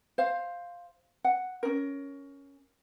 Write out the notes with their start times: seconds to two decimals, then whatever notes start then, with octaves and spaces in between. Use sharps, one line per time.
0.18 C5 F5
1.24 F#5
1.63 C#4 A#4